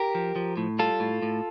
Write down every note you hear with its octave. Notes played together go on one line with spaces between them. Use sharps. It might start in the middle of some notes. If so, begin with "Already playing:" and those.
Already playing: G4 A#4
F3
F3
A2
G3 F4 A4
A2
A2